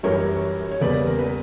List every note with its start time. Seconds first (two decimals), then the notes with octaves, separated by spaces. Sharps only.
0.03 F#2 E3 G3 A#4 C#5
0.71 C#5
0.81 E2 C#3 G3 A#3 B4 D5
1.07 A#4
1.19 B4